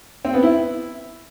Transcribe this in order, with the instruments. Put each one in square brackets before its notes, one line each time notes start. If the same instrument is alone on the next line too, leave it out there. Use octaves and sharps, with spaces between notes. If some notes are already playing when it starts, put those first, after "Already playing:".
[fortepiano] C4
B3
E4